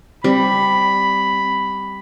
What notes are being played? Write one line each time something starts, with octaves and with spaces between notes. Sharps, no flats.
G3 C4 B5